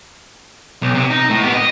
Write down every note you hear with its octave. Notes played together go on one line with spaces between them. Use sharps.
B1
C3
D#4
A2
B3 G4
D#5